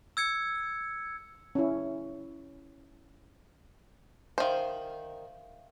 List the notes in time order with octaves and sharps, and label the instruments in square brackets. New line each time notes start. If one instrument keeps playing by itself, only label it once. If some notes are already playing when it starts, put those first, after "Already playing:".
[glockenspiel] E6 G#6 C#7
[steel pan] C#4 E4
[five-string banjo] D#3 C5 [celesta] E5 F5